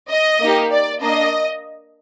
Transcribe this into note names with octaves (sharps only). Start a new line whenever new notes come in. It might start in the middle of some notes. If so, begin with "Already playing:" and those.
D#5
A#3 D#4 G4
D5
A#3 D4 D#5